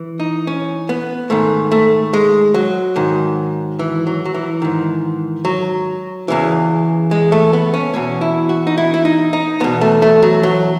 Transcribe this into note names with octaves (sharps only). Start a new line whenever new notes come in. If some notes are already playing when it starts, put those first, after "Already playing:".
Already playing: E3
D#4
C#4
B3
G#2 D#3 A3
A3
G#3
F#3
G#2 D#3
E3
F#3
F#3
E3
G#2 D#3
F#3
E2 C#3 E3
G#3
A3
B3
C#4
E2 B2 C#4
E4
F#4
D#4
E4
E4
D#4
D#4
E2 B2 B3
A3
A3
F#3
F#3